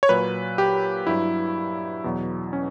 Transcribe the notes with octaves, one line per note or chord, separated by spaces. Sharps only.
C#5
A#2 F#3 B4
G4
G2 F#3 E4
E2 B2 F#3
C#4